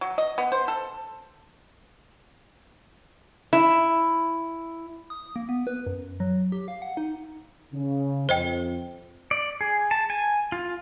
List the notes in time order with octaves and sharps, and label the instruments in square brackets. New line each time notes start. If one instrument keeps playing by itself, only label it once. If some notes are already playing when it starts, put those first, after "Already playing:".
[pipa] F#3
D#5
B3
C5
A4
[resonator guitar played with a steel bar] E4
[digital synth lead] D#6
A#3
B3
B4
F#2
F#3
G4
F5
F#5
D#4
[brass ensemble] C#3
[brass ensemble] F2 [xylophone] C5 D#5 G5
[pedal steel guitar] D5
G#4
A5
G#5
F4